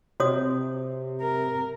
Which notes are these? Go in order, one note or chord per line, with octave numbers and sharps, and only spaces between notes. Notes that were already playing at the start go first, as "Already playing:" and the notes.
C3 F#4 C#5 D#6
A#4